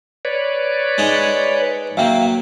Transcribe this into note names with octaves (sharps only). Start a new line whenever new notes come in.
B4 C#5 D5
G#3 D#4 D#5
F#3 A#3 E5 F5 G5